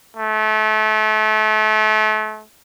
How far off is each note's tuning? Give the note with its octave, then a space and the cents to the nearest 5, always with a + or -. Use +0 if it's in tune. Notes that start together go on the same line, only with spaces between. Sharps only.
A3 -30